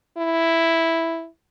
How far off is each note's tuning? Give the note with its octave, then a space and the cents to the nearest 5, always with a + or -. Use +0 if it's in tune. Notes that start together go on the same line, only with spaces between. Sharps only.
E4 +0